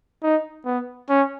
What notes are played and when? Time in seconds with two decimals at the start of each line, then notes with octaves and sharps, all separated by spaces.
0.23 D#4
0.66 B3
1.09 C#4